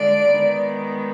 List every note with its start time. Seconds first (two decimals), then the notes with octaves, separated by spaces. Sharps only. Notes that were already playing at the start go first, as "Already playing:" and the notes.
Already playing: D3 G#3 D4 F4 D5
0.30 D#3 G#3 B3